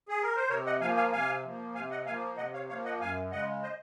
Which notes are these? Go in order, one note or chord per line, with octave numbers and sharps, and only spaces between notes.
G#4
A#4
C5
C3 A#4 C#5
D#5 F#5
F3 A#3 F5 G#5
F5 G#5
C3 F5 G#5
F3 A#3
C3 F5 G#5
D#5 F#5
F3 A#3 F5 G#5
C3 D#5 F#5
C#5 F5
F3 A#3 C#5 F5
D#5 F#5
F#2 F5 G#5
C#3 G#3 D#5 F#5
C5 D#5